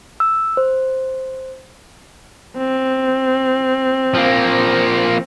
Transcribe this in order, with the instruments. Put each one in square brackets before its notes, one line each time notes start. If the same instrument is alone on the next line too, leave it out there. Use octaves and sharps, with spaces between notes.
[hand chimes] E6
C5
[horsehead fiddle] C4
[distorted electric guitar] F3 A#3